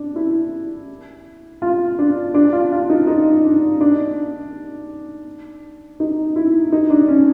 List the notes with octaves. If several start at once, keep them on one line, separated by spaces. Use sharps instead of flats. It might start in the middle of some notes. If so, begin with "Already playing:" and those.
Already playing: D4
E4
F4
D4
D4
F4
F4
D#4
D#4
D4
D4
D#4
E4
D#4
D4
C#4